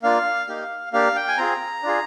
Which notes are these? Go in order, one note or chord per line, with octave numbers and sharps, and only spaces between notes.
A#3 D4 F4 F5
A#3 D#4 G4
A#3 D4 G4 F5
G5
G#5
C4 F4 G#4 A#5
D4 F4 G#4